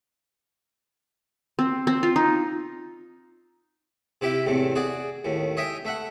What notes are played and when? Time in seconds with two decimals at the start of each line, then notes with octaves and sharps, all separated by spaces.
1.59 C4
1.87 C4
2.03 F4
2.16 D#4
4.21 C3 E4 G4 E5 G5
4.46 E2 A2 C3
4.75 F#4 G#4 D5
5.24 D#2 A2
5.57 C#5 D#5 E5 G5 G#5
5.85 A3 E5 F#5